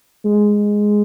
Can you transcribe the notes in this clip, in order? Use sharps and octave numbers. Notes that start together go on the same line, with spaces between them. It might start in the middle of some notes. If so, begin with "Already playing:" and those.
G#3